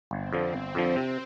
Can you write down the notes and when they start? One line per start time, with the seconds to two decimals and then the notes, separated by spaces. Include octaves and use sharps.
0.11 G1 C4
0.33 F2 D3 F3
0.54 G1
0.75 F2 D3 F3
0.96 C3